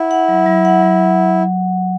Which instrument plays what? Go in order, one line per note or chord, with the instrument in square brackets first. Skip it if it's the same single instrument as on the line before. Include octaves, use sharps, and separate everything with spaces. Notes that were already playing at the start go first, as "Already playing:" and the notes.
Already playing: [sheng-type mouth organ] E4 [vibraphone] F#5
[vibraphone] F#5
F#3
F#3
F#5
F#3